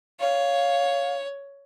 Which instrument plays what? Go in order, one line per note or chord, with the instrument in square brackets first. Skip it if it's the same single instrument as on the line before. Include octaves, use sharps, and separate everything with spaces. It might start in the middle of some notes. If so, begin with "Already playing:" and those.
[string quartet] C#5 [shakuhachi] F5